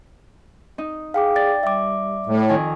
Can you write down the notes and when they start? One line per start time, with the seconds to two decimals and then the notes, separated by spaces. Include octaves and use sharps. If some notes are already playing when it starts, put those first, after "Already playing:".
0.78 D#4
1.14 G#4 F5 G5 D6
1.36 D5 G5 A6
1.63 G3 E5 D6
2.26 A2
2.49 F2 D#3 G#5